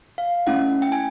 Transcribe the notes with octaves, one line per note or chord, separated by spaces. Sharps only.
F5
A3 C#4 E4 F#5
G5
G#5